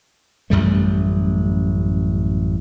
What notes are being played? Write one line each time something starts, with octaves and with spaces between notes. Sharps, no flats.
A1 F#2 G3 A3